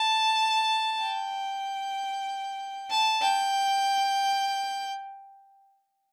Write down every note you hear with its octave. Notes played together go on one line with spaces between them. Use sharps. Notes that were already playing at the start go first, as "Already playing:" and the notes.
Already playing: A5
G5
A5
G5